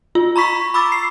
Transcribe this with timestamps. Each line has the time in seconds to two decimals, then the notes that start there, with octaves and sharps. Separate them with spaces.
0.15 F4
0.36 A#5 B5 C#6 B6
0.74 B5 D6 E6 A6
0.92 C7